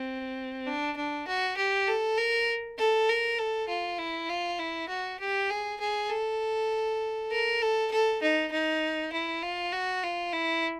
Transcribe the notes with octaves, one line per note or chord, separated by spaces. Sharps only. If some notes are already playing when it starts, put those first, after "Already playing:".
Already playing: C4
D4
D4
F#4
G4
A4
A#4
A4
A#4
A4
F4
E4
F4
E4
F#4
G4
G#4
G#4
A4
A#4
A4
A4
D#4
D#4
E4
F4
F#4
F4
E4